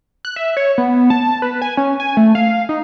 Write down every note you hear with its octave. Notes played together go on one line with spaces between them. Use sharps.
F#6
E5
C#5
B3
A5
B4
G#5
C#4
G#5
A3
F5
D#4